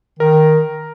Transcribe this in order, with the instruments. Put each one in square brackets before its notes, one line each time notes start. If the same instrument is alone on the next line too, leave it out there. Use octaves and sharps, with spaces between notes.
[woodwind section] D#3 [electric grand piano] A#4